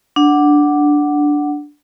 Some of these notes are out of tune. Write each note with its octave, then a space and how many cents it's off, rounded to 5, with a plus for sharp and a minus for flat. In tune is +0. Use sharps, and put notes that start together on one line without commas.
D4 +0 F#5 +0